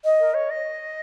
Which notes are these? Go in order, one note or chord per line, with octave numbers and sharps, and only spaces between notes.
D#5
A#4
C#5
D#5